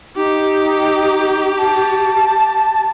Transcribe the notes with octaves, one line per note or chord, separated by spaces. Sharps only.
D#4 G4
A5